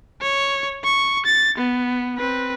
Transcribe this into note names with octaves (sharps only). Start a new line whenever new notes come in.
C#5
C#6
A6
B3
C4 B4